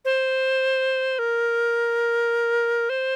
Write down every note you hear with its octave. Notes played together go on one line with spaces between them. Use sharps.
C5
A#4
C5